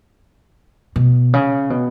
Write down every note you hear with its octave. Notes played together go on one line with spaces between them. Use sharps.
B2
C#3
B2